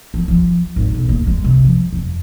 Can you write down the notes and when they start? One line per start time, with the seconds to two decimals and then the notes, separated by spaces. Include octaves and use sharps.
0.14 F3
0.28 F3
0.76 G#1
0.94 B1
1.09 A#3
1.27 G#3
1.44 C3
1.64 F3
1.93 F2